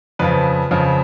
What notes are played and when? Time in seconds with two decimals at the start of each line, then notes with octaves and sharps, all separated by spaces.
0.19 F2 C#3 F3 B4
0.71 F2 C#3 F3